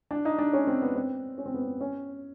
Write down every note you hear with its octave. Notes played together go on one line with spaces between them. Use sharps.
D4
D#4
D4
C#4
C4
B3
C4
C#4
C4
B3
C4
C#4